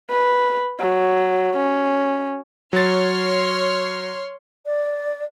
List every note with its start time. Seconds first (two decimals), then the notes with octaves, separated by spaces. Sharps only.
0.11 B4
0.80 F#3
1.57 C#4
2.73 F#3 C#5 C6 F6 A6
4.66 D5